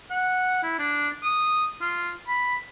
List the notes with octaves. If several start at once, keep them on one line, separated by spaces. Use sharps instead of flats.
F#5
E4
D4
D#6
F4
B5